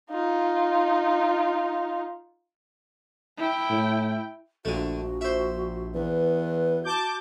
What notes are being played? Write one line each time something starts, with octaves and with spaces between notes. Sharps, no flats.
D#4 F4
E4 G5
A2
A#1 D3 A3 F#4
C5 E5
E2 B4
F#4 A5 D6 G6